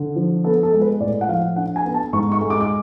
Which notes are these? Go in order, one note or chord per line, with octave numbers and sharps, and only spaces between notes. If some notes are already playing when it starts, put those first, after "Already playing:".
Already playing: D3
F3
B3 A4
A4
G#3
B4
A2 D5
F#5
F3 F5
D4 F#5
G#5
B3
A5
G#2 C#6
C#6
G#3
D6
D6